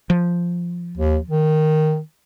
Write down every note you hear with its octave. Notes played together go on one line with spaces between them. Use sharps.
F3
D#2
D#3